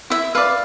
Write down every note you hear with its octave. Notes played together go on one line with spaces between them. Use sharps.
E4 E5
B4 D5 F5